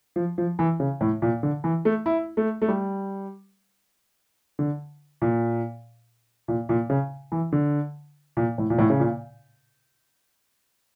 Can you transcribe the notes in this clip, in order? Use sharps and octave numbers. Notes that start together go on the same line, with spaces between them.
F3
F3
E3
C#3
A2
A#2
D3
E3
A3
E4
A3
A3
G3
D3
A#2
A#2
A#2
C#3
E3
D3
A#2
A2
A#2
A2
C#3
A#2